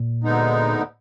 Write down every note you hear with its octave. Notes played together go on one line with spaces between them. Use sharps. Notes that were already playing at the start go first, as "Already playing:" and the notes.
Already playing: A#2
D2 D3 G#3 B3 D#4